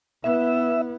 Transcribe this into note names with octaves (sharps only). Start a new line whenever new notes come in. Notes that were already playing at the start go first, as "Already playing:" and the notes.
B3 E4 E5